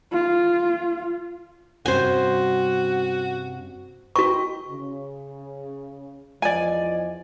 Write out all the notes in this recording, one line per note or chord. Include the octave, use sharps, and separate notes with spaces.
F4
G2 C3 C#4 F#4 C5 G#5
F#4 D#5 G5 A#5 C#6
C#3
E2 F3 D5 D#5 G#5